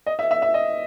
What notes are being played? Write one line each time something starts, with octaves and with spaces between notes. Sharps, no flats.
D#5
E5
E5
E5
D#5